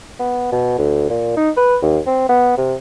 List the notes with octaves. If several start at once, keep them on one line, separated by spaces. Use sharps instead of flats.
B3
B2
D2
A#2
D#4
B4
D#2
C4
B3
C3